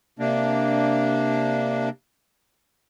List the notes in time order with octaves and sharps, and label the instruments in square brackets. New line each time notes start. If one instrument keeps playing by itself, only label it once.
[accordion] C3 A#3 D4